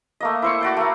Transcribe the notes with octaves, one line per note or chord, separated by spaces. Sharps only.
A3 A#3 D#5
E4 C5 C#6
F#4 D5 G5
A3 A#3